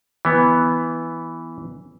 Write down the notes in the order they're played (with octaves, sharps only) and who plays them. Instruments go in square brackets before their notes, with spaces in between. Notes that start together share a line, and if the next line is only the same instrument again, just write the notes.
[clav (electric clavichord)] E3 B3